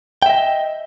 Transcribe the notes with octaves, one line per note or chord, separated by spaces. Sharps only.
D#5 E5 G5